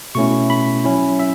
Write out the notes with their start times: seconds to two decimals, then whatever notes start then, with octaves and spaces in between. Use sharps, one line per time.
0.15 B2 A3 C#4 E4 C#6
0.50 B5
0.85 F#3 C#4 E4
1.19 E5